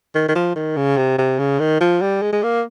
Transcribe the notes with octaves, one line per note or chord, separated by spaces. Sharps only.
D#3
D#3
F3
D#3
C#3
C3
C3
C#3
D#3
F3
G3
G#3
G#3
A#3